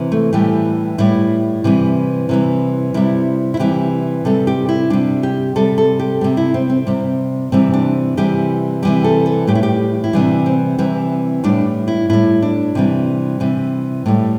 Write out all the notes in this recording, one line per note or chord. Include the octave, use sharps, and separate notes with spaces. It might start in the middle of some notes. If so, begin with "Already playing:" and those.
Already playing: C3 E3
A3
A2 E3 G3 G4
A2 G3 E4
C3 E3 G3
C3 E3 G3
C3 G3 E4
E4
C3 E3 G3 G4
C3 G3 A4
G4
E4
C3 G3 D4
G4
C3 G3 A4
A4
G4
C3 G3 G4
E4
C4
C4
C3 G3
C3 E3 G3 C4
D4
C3 E3 G3 G4
C3 E3 G3 G4
A4
A4
A2 G3 G4
E4
G4
E4
C3 E3 G3 D4
C4
C3 E3 G3 C4
A2 G3 D4
E4
A2 G3 E4
D4
C3 E3 G3
C3 E3 G3
A2 G3